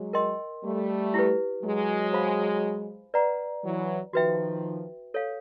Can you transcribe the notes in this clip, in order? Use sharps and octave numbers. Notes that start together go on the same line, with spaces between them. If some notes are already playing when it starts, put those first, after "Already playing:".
Already playing: F#3 G#3
A#4 D#5 G5 C6
G3 A3
E4 G4 B4
F#3 G#3
G#4 C5 F5 G#5 B5
B4 D5 F#5 A#5
E3 F#3
D#3 F3 F#4 B4 E5 G5
A4 C#5 F5